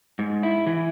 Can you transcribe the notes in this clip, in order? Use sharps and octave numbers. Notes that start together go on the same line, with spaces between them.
G#2
E4
E3